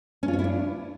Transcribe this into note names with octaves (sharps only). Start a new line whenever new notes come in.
C#4
F4
C#5
E4
D4